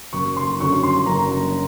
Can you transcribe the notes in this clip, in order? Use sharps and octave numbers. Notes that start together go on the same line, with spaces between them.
F#1 C#6
C6
F#2 D3 C#6
C6
F#1 A#5